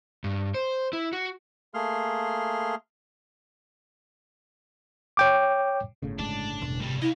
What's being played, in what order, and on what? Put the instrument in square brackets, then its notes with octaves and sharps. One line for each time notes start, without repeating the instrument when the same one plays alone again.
[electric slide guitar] G2
C5
E4
F#4
[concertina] A3 A#3 G#4 C6 F6
[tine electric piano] C#5 G5 D6
[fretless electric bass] G1 A2 C#3
[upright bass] G#3 [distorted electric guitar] D4
[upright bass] E1
[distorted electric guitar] F2 G3 [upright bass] C3
[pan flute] E4 [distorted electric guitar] D#5 F5